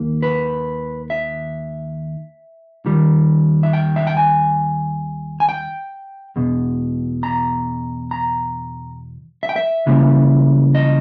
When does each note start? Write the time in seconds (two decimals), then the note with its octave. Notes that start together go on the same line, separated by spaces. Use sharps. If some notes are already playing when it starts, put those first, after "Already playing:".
Already playing: D#2 D#3 A#3
0.22 B4
1.10 E5
2.86 D#2 D#3 G3
3.63 E5
3.73 G5
3.96 E5
4.07 G5
4.17 G#5
5.40 G#5
5.49 G5
6.36 E2 B2
7.23 A#5
8.11 A#5
9.43 E5
9.49 G5
9.56 E5
9.86 C#2 C#3 E3 G3 A#3
10.75 D#5